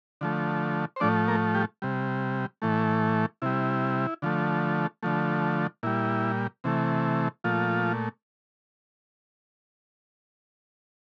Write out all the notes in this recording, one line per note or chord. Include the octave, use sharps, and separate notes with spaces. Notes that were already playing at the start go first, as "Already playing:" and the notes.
D3 F3 A3
C5
A2 F3 A3 D4 D5
A#3 A#4
G3 G4
C3 G3
A2 E3 A3
C3 G3 E4
D3 F3 A3
D3 F3 A3
A#2 G3 E4
C3 E3 A3
A#2 F3 A3 F4